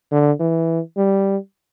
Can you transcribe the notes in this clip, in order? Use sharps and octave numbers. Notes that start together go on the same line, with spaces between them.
D3
E3
G3